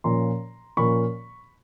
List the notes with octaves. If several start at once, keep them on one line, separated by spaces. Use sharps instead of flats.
A#2 F3 A#3 C#4 A#5 C6
A#2 F3 A#3 C#4 B5 C#6